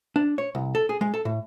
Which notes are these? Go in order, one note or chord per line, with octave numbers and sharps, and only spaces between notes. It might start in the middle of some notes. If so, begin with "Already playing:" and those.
D4
C#5
C2
A4
G#4
G#3
A4
A2